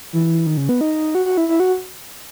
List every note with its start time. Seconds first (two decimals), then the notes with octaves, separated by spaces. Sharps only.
0.13 E3
0.46 D#3
0.57 C#3
0.69 B3
0.81 D#4
1.15 F#4
1.26 F#4
1.37 E4
1.48 E4
1.60 F#4